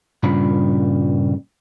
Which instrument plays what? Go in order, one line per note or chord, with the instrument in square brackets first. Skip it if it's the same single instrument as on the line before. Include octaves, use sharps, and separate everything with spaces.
[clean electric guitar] G2 A#2 C#3 G3 A#5 B5